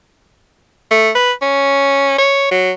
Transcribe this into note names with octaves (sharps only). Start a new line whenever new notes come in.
A3
B4
C#4
C#5
F#3